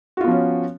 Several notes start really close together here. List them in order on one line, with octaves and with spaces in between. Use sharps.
F#4 F4 B3 F3 C#4